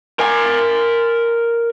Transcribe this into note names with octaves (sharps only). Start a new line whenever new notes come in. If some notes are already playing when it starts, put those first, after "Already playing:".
A#4 G#5